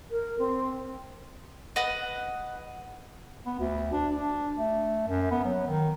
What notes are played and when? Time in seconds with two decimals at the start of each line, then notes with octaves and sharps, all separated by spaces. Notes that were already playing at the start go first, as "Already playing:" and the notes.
0.10 A#4
0.39 C4
1.76 B4 D#5 F#5
3.46 B3
3.59 D2
3.92 D4
4.15 D4
4.56 A3
5.08 F#2
5.31 B3
5.45 F#3
5.67 D#3